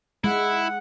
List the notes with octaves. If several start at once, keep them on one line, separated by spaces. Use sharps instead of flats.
G#3 E4 F#5